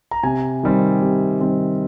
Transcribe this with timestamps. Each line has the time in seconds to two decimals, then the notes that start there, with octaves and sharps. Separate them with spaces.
0.11 A#5
0.23 C3 G#5
0.63 D#3 G3 C4
1.02 C3
1.40 D#3 G3 C4